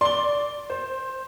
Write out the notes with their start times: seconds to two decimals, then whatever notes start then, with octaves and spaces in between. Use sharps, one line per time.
0.01 D5 C6 G7
0.70 C5